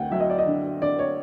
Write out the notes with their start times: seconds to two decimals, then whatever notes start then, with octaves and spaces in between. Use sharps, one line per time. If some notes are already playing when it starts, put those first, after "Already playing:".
Already playing: D2 F#5 G5
0.11 F#3 E5
0.20 D#5
0.30 D5
0.38 D#5
0.46 D3
0.81 D3 D5
0.99 C#5